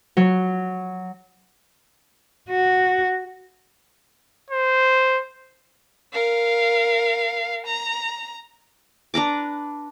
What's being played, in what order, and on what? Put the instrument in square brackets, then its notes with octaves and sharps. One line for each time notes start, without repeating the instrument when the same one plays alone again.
[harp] F#3
[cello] F#4
[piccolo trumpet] C5
[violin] A#4 F5
A#5
[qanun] D4 B4 A#5 D6